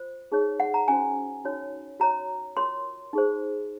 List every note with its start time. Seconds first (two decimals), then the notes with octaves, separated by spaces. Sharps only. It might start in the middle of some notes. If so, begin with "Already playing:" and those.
Already playing: F4 C5
0.32 D#4 G#4 C#5
0.60 F#5
0.74 A#5
0.88 C#4 F#4 C5 G#5
1.45 D#4 F#4 C#5
2.00 F#4 C#5 A#5
2.57 F4 A#4 C#5 C6
3.13 D#4 G#4 C5